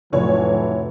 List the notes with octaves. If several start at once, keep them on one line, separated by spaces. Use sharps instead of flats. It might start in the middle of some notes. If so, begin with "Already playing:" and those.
F1 A2 E3 F#3 C#5